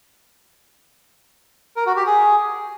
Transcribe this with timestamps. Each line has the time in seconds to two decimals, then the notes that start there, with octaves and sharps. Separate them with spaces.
1.76 A#4
1.86 F#4
1.96 G4
2.06 G#4